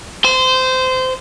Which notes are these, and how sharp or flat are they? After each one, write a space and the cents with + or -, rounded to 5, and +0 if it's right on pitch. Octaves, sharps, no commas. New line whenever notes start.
C5 -20